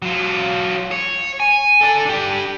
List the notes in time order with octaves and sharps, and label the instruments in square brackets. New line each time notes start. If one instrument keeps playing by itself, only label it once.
[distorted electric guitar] F#3 F4
C#5
G#5
A4 D5
D4 G4